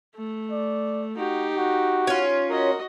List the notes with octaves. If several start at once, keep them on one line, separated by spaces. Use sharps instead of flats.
A3
D5
D#4 F#4 G4
F#4
C#4 F4
F#4 A#4 D#5